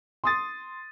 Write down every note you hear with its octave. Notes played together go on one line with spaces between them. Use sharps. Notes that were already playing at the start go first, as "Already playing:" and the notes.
C6 D#6 A6